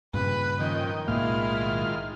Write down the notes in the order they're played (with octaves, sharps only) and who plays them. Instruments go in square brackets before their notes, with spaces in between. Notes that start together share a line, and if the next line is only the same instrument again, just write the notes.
[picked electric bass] G2 A#2 C#3 [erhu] B4
[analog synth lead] D#3 [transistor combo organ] F3 C#4 G5 [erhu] D#5
[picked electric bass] B1 A2 A#3 [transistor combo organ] G#3 F4 F6 [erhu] E4